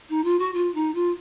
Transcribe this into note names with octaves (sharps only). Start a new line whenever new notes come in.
D#4
F4
F#4
F4
D#4
F4